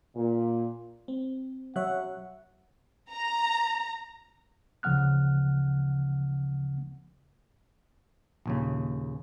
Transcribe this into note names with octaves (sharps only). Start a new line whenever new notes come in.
A#2
C4
F#3 C#5 E5 F#5 F#6
A#5
D2 C#3 F3 F#5 F6 F#6
A#1 D#2 C#3